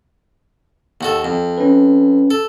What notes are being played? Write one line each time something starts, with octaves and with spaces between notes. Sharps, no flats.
D#2 F#4 A4
F2
C#4 B4
A4